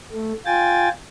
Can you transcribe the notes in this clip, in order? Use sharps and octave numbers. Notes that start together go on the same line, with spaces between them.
A3
F4 G5 G#5 A6